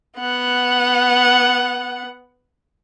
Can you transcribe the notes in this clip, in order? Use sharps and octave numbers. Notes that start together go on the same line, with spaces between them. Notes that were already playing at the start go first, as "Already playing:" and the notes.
B3 F#5